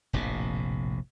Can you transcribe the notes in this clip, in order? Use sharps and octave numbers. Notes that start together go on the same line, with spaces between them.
F1 A#1 A2 C3